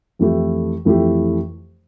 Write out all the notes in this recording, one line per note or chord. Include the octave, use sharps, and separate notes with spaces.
F2 E3 A3 E4 G4
F2 E3 A3 E4 G4